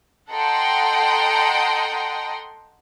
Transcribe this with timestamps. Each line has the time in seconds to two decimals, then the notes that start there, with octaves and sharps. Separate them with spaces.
0.29 A4 D#5 F#5 G5 A#5 C6